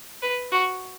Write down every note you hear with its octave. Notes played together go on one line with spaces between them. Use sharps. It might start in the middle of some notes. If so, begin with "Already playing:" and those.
B4
F#4